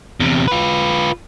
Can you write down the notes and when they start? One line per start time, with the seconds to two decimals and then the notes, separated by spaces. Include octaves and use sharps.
0.20 E2 C3
0.48 F4 B4